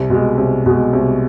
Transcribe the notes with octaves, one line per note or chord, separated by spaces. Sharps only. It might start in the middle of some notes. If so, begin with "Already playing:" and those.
Already playing: C2
B2 G#3
C2
B2 G#3
C2